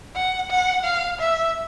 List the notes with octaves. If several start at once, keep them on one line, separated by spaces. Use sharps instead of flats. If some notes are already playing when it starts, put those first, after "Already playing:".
F#5
F#5
F5
E5